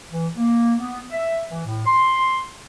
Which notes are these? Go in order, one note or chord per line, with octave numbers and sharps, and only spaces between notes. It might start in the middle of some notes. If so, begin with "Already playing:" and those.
E3
A#3
B3
E5
E3
A2
C6